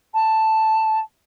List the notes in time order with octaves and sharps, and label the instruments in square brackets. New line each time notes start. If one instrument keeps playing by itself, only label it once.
[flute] A5